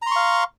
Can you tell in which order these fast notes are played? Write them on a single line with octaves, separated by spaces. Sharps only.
A#5 C6 C#6 F5